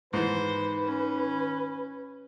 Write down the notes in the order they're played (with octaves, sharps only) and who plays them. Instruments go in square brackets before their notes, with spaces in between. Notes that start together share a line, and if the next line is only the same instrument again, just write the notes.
[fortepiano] G#2 E3 [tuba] D#3 [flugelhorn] B4 [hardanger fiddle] C5
[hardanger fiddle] C#4